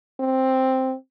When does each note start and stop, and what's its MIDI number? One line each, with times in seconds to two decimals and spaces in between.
0.20 0.95 60